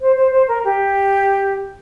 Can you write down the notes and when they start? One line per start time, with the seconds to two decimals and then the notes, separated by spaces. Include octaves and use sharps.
0.01 C5
0.16 C5
0.32 C5
0.48 A#4
0.65 G4